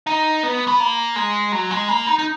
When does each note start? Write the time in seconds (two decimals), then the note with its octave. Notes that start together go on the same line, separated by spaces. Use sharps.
0.07 D#4
0.43 B3
0.68 B3
0.80 A#3
1.16 G#3
1.52 F#3
1.71 G#3
1.89 A#3
2.07 D#4
2.19 D#4